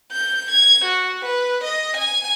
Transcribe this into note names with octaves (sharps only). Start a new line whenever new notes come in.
G6
G#6
F#4
B4
D#5
G#5